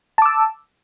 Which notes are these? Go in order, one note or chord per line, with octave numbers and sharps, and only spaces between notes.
A5 D6 E6